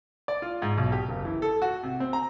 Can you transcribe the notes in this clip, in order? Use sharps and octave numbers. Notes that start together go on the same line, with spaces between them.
D5
F4
G#2
B1
G4
F#1
E3
A4
F#4
C3
C4
A#5